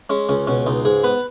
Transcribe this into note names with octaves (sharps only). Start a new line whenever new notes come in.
G#3 C#4
C#2 C#4
B2 C#4
C#2 D#4
G#2 G#4
B3 B4